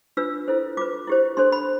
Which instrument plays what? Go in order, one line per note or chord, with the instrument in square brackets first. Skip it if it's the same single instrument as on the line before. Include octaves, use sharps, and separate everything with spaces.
[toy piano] D4 F4 B4 E6
E4 A4 C5
F4 B4 D6
E4 G4 C5
D4 A4 C5 C6
B5